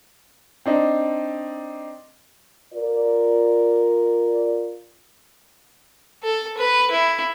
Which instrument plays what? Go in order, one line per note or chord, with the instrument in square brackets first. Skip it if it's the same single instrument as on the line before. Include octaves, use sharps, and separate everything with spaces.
[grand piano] C4 D4 D#4
[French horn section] F4 A#4 D5
[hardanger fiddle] A4
B4
E4